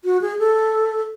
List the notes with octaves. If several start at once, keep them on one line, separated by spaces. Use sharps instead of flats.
F#4
G#4
A4